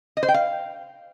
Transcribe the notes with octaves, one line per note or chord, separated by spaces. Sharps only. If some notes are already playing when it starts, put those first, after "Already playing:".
D#5
C5
G5
F5